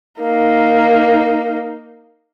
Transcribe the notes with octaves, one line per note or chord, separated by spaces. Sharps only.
A#3 D#4